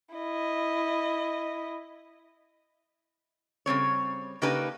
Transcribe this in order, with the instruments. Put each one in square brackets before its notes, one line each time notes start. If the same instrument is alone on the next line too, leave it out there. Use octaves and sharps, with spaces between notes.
[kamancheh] E4 D#5
[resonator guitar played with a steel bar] C#3 G3 C4 C#5
C#3 A#3 D4 D#4 G4 B4